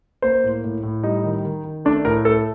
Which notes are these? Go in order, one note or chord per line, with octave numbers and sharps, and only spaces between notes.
A#3 C5
A2
A2
A2
G3 D#4
D#3
D#3
D#3
A3 D4
A2 A#4
A3 A4